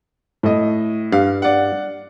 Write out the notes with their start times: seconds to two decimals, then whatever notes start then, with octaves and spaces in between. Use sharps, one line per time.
0.43 A2 D#5
1.12 G2 F5
1.42 D5 F#5